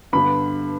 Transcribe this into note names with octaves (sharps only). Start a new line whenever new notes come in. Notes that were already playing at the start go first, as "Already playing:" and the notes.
G2 D3 B3 B5